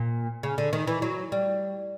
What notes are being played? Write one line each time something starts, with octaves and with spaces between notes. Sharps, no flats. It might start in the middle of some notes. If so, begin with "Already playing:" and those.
Already playing: A#2
C#3
D3
D#3
E3
F#3
G3